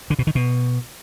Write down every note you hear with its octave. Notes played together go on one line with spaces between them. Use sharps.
D3
B2
D#3
B2